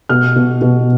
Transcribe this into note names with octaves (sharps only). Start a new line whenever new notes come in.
B2 F6
B2
B2